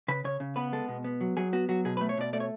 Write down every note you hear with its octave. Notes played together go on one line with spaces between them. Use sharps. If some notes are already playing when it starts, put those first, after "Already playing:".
C#3 B4
C#3 C#5
C#3
B3 B4
G#3 A4
B2
B3
F#3
F#3 G#4
B3 F#4
F#3 F#4
B2 G#4
B4
A3
C#5
B2 D5
A3 D5
C#5